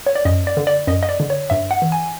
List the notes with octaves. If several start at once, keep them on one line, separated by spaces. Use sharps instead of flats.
C#5
D5
F#2 D#5
D5
D3
D5
F#2 D#5
D#5
D5
D3
C#5
G2 E5
F#5
E3
G#5